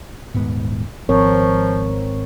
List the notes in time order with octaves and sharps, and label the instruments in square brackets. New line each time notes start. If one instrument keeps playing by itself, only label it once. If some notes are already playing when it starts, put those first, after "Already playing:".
[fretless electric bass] D#1 G#2 B3
[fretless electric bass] G#1 [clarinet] F3 [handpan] C4 A#4 C#5